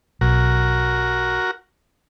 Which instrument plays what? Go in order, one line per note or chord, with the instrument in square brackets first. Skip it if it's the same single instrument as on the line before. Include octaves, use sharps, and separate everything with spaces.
[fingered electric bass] B1 [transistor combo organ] F#4 A#4